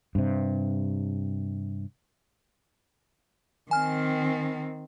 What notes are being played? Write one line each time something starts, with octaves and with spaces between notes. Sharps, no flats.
G2 C3
D#3 C4 G#5 F6